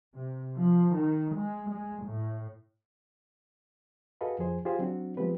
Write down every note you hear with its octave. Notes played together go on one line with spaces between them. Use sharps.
C3
F3
D#3
G#3
G#3
A2
F#4 G#4 A4 B4 D#5 F5
F2 F3 G#4 C5
F4 G4 G#4 C5 F5
F#3 C4 D4 F#4
F3 G#3 B3 C4 G4 B4